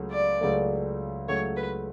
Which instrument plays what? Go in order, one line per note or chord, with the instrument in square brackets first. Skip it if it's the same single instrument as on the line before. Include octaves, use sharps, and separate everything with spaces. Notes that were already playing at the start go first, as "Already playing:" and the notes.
Already playing: [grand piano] C#2 C#3 F#3 A3
[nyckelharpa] D5
[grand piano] C#2 C#3 F#3 A3
[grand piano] C#2 C#3 F#3 A3 [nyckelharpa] C#5
[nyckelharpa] B4